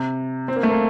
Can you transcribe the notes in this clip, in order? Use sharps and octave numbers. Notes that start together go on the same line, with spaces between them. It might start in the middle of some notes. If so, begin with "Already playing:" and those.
Already playing: C3
C4
A#3
A3
A#3